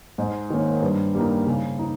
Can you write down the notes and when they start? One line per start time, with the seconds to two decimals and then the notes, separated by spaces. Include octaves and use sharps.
0.18 G#2
0.50 D#3 A#3 C#4
0.82 G2
1.15 G3 A#3 D#4
1.47 C#3
1.79 D#4